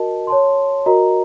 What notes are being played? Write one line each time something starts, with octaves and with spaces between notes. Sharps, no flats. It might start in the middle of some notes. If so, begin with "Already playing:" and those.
Already playing: F#4 A#4 D#5 A5
C#5 A5 C6
F#4 A#4 D#5 A#5